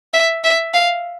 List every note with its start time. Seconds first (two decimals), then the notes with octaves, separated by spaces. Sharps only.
0.13 E5
0.44 E5
0.74 F5